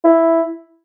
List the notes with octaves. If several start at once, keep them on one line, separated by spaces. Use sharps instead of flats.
E4